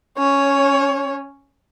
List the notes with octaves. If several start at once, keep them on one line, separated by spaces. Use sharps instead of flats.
C#4 C#5